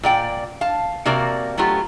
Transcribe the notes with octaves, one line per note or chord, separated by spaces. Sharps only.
A#2 D5 G5
F5 A5
C3 A#3 F#4 A#4 D5
F#3 A3 B3 F4 G4